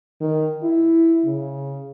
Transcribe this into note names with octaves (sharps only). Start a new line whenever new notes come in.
D#3
E4
C#3